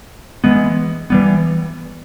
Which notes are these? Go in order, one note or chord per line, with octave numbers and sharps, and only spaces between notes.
E3 G#3 B3
E3 G3 B3